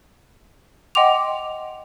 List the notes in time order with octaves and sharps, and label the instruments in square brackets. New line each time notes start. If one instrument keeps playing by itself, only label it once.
[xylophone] D#5 F#5 G5 C6 D6 F7